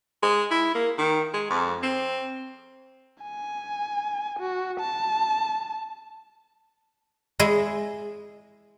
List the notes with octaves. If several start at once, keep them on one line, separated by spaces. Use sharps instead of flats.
G#3
E4
A#3
D#3
G#3
F2
C4
G#5
F#4
A5
G#3 E4 D#5